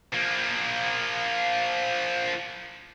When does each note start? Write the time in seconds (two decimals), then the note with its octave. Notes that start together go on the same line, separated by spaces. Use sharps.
0.13 F3 A#3